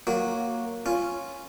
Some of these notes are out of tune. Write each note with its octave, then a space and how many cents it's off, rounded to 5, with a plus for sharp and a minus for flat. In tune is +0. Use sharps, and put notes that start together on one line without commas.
F#3 +0 A#3 +0 F#4 -15
C#4 +0 F4 -5